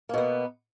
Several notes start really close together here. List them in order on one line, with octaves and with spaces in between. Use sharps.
A#3 B2 B3